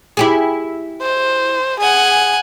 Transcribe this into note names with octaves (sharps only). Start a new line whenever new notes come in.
E4 G4 G#4
C5
G#4 F#5 G#5